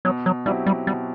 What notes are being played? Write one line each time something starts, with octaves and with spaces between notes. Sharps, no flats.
B2 F#3
F#3
F#3 G3 C4 E4 G4
G3
B2 G3